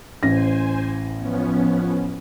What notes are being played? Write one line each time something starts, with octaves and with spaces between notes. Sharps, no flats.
A1 C5 G#5 A#6
F3 B3 C#4